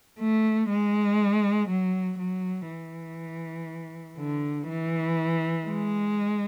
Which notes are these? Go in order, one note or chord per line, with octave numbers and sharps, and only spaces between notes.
A3
G#3
F#3
F#3
E3
D3
E3
G#3